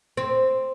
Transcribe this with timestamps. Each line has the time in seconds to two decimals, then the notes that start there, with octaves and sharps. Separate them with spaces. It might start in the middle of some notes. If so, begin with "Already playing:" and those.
0.17 C4